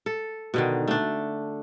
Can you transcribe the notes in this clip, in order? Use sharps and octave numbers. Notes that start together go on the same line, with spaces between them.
A4
B2 D3 D#3
A3 D4